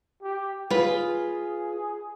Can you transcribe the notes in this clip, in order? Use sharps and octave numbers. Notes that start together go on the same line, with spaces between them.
G4
F4 G#4 B4